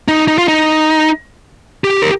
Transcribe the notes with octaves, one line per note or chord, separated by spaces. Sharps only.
D#4
D#4
F4
D#4
G4
A#4